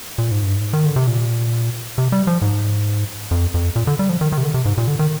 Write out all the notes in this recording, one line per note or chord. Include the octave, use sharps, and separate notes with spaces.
A#2
G#2
G2
G#2
D#3
D3
C3
A#2
C3
G3
F3
G#2
F2
F2
A#2
D3
G3
F3
D#3
D#3
C3
D3
C3
G#2
A#2
D3
D#3